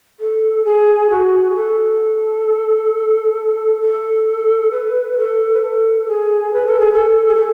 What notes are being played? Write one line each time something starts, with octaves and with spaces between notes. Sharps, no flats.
A4
G#4
F#4
G#4
A4
A4
B4
B4
A4
B4
A4
G#4
B4
A4
G#4
A4
G#4
A4